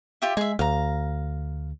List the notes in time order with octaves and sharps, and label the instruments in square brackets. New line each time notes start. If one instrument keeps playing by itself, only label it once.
[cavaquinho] F4 G4 E5
[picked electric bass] G#3 [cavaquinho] G#4 E5
[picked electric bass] D2 [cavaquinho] F5 A#5